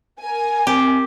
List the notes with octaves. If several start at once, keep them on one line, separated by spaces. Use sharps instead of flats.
A#4 G#5
C4 G4